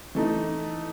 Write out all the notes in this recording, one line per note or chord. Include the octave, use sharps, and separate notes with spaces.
E3 A3 D#4